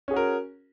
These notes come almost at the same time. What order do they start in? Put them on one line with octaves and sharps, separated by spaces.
C#4 G#4 F#4 A#4